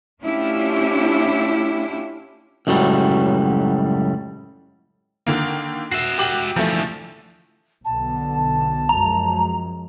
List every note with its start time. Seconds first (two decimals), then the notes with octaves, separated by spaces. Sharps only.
0.21 A3 C#4 D4 E4 F4 G4
2.67 C#2 F#2 A2 F#3 G3
5.27 D3 D#3 A#3
5.92 F#4 E5 C7
6.18 G4 D6 F#7
6.56 D2 E3 F3 A3
7.85 B1 D3 B3 A5
8.89 F#2 F3 G#3 A#5